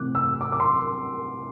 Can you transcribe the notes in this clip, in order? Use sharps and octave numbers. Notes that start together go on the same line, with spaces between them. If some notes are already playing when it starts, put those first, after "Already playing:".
Already playing: C3 E3 A3 C4 D6 F#6
E6
D6
D6
C6